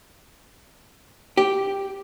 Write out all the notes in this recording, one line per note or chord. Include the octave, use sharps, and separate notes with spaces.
G4